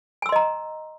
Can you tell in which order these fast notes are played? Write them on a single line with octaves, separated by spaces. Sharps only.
G#5 E6 C6 D#5 A#5